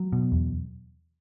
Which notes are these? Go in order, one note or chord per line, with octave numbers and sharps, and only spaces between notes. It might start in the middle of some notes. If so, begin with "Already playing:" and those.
Already playing: F#3
B2
E2